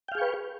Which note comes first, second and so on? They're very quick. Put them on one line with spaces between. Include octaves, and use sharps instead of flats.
G5 F5 G#4 C#6 B4